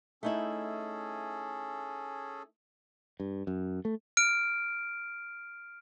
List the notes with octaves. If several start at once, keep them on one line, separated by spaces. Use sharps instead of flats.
A3 C#4 D#4 E4 G#4 A4
G2
F#2
A3
F6 D7